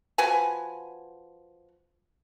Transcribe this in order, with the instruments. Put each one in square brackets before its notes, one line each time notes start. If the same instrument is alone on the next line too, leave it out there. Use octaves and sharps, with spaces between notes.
[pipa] F3 F#4 B4 G#5